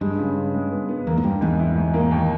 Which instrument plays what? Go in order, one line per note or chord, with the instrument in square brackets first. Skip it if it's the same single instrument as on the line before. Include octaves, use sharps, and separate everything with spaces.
[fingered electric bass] G2 [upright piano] G#3
[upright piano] C#3
C#3
G#3
B3
B3
[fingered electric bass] E2 [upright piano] A#3
[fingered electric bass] G#2
[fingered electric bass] G2 [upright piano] G3
[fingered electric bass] E2 [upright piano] G#2
[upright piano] E4
G#2
A#3
D#2